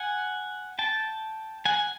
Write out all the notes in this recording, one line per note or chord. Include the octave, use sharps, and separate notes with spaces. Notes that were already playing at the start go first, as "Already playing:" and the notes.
Already playing: F#5 G#5
G5 A5
F#5 G#5